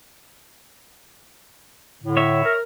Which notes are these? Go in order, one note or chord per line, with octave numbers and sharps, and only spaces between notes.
A2 D3
C#5 E5
A#4